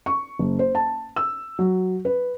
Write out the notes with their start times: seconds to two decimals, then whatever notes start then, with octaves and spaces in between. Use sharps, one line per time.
0.06 C#6
0.39 F#1
0.59 C5
0.75 A5
1.16 E6
1.59 F#3
2.05 B4